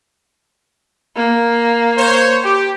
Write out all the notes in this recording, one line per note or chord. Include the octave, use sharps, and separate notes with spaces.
A#3
C5 C#5
G4